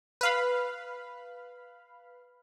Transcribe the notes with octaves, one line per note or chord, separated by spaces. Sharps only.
B4 F5 B5